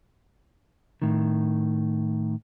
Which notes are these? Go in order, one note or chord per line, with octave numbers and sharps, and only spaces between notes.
A2 D#3